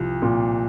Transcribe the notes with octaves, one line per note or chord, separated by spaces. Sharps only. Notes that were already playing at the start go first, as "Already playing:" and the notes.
Already playing: C2 F3
A#2